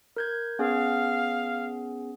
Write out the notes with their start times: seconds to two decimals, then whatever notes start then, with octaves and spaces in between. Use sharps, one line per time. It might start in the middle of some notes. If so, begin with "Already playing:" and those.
0.17 A#4 G6 G#6
0.59 B3 C#4 G#4 F5